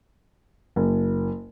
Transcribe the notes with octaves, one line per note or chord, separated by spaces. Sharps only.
F#1